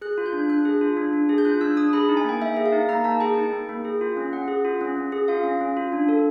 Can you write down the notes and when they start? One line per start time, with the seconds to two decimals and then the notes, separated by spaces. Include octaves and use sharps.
0.01 G#4 F#6
0.18 F4
0.26 G6
0.33 D4
0.50 D4 F#6
0.65 G#4
0.81 F4
0.97 D4
1.13 D4
1.29 G#4
1.38 G6
1.45 F4 F#6
1.61 D4 E6
1.77 D4 D#6
1.93 G#4 B5
2.09 D#4
2.17 G#5
2.24 A#3 G5
2.41 A#3 E5
2.57 G#4
2.66 F5
2.73 D#4
2.89 A#3 A#5
3.04 A#3 A5
3.20 G#4 G5
3.37 D#4
3.53 A#3
3.69 A#3
3.85 G#4
4.01 F4
4.17 C#4
4.33 C#4 F#5
4.48 G#4
4.65 F4
4.81 C#4
4.97 C#4
5.12 G#4
5.28 F4 F5
5.44 C#4
5.61 C#4
5.77 F4
5.93 D4
6.09 A4